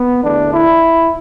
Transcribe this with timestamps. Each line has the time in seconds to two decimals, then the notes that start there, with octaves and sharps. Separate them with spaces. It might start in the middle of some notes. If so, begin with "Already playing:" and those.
Already playing: B3
0.23 E2 D3 A3 D4
0.53 E4